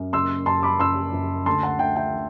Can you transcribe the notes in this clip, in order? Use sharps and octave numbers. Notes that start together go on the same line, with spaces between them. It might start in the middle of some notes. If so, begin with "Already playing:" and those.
Already playing: F#2
F#1 C6 E6
F#2 A5 C6
B5 D6
F#2 C6 E6
F#2
D2 A5 C6
F#5 A5
D2 E5 G5
E5 G5
D3